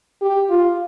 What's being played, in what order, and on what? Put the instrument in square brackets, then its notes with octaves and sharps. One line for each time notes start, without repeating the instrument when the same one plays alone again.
[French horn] G4
F4